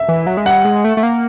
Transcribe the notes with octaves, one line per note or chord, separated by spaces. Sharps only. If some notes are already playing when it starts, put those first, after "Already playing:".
Already playing: E5
E3
F#3
G#3
G3 F#5
G#3
A3
A3
A#3